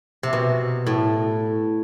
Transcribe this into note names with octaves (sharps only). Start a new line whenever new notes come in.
C3
B2
A2